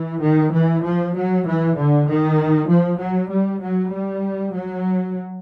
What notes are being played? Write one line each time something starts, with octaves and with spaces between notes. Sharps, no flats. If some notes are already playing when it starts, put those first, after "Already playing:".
Already playing: E3
D#3
E3
F3
F#3
E3
D3
D#3
F3
F#3
G3
F#3
G3
F#3